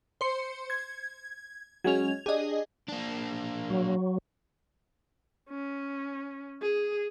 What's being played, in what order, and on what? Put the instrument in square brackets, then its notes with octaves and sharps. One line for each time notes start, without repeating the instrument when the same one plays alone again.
[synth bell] C5 C6 C#7
G#6
[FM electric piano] F#3 G#3 C#4 [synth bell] G#6 F7
[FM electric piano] D4 G4 [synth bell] G#4 D#5
[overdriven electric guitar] A#3 D4
[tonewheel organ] F#3
[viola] C#4
G#4